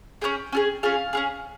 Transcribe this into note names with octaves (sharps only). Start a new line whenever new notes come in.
C#4 F4 G#4 G5
C#4 F4 G#4
C#4 F4 G#4 F5
C#4 F4 G#4